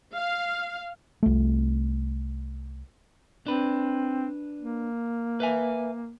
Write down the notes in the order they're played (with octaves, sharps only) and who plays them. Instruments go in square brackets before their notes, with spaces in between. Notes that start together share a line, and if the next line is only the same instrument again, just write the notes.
[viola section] F5
[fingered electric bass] C2 A3
[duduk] C4 [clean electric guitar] D4 B4
[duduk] A#3
[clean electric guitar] B4 E5 G#5